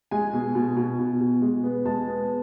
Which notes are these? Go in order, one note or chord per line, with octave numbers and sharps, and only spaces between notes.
G#3 G#5
B2
B2
B2
B2
B2
G#3
B3
G#3 A5
B3